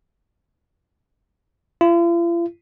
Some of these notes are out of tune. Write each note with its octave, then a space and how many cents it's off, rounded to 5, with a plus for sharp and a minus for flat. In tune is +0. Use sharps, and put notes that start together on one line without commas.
F4 -45